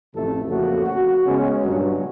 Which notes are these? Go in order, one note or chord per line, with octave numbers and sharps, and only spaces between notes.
A1 F2 C3 A3 A4
F2 C#3 A3 A#3 F#4
F#4
C#3 G#3 B3 C#4
G2 A#2 F#3